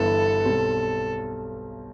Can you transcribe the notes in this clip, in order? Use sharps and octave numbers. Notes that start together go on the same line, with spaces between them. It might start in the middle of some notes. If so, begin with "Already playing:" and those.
Already playing: G1 G2 E3 B3 E4 A4
B1 B2 G3 C4